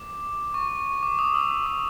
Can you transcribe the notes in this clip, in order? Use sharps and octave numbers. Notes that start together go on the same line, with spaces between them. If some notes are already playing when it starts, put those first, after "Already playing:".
Already playing: D6
C#6
D6
D#6
E6
D#6
D6